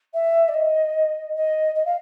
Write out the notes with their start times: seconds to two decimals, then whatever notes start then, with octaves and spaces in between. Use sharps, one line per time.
0.13 E5
0.48 D5
0.54 D#5
1.35 D#5
1.75 D#5
1.85 F5